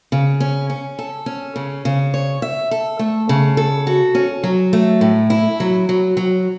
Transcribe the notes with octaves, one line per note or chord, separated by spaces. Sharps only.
C#3
C#4
C#4
A4
C#4
C#3
C#3
C#5
E5
A4
A3
C#3
A4
F#4
C#4
F#3
A3
A2
E4
F#3
F#3
F#3